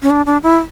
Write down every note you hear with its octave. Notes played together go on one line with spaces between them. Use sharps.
C#4
D4
D4
E4